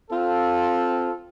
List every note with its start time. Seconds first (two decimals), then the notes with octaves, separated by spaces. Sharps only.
0.11 C4 F4 A4